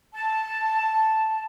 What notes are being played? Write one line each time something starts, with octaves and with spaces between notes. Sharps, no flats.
A5